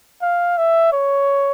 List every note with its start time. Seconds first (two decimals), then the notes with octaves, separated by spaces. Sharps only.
0.22 F5
0.57 E5
0.93 C#5